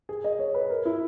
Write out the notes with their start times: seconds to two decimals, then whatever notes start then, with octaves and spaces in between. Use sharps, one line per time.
0.09 G#4
0.24 D#5
0.39 C#5
0.54 B4
0.70 A#4
0.85 E4